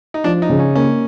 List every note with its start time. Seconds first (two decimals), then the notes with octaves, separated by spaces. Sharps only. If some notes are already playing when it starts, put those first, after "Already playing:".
0.14 D#4
0.24 F3 D4
0.42 D#4
0.50 C#3
0.59 C#4
0.75 A#3 C#4